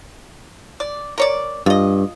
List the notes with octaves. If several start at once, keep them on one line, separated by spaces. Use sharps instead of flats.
D5
A#4 C#5 D5
G2 F4 D#5